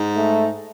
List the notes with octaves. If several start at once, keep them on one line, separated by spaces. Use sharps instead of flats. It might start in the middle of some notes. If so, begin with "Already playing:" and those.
Already playing: G#2
A3